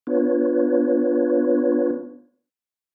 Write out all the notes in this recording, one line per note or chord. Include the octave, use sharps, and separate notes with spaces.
B3 D4 F4 B4 C#5